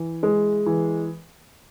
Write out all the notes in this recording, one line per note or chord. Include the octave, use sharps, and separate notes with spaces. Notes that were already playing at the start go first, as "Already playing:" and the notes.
Already playing: E3
G#3
E3